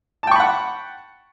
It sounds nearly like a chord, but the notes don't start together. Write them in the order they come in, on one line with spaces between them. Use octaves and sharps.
A5 G5 C#6 B5 F#5